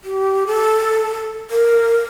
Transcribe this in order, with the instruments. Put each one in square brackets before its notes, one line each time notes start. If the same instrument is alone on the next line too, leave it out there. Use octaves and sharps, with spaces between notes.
[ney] G4
A4
A#4